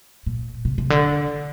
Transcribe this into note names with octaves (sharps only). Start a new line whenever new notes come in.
A#2
C3
C3
D3